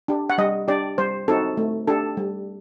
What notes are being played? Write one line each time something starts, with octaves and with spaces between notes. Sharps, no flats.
D4 G4
F#5
G3 D#5
D4 G4 D5
G3 C5
C4 D#4 F#4 A4
A3
D4 G4 A4
G3